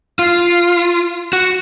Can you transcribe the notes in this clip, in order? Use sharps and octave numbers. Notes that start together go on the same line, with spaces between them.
F4
F#4